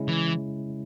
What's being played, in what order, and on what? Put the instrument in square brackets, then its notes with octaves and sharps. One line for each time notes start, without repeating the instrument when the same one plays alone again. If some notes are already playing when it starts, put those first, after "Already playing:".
Already playing: [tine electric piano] C#3 G#3 C#4 E4
[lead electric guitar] E3